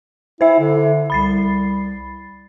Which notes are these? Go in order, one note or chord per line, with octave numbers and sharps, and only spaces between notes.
E4 C5 E5
D3
C2 B5 A6 C7